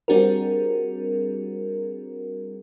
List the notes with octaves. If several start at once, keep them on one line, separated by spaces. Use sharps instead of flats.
G3 C4 D4 F#4 G#4 A#4